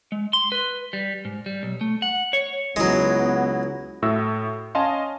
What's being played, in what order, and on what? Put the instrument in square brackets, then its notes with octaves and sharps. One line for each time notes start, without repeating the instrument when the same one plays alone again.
[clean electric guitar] G#3
C6
B4
G3
G#2
G3
B1
A3
F#5
C#5
[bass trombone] C#2 [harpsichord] F#3 G#3 [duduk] B3 [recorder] E4
[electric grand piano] A2 F#4 E5 E6 A#6
C#4 D#5 F5 G#5 A5 C6